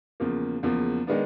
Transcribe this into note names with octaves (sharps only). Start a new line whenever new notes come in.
E2 C#3 F3 A#3
E2 C#3 F3 A#3
D#3 G#3 B3 D4